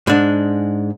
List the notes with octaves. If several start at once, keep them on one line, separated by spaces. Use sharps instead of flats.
G#2 G#3 D4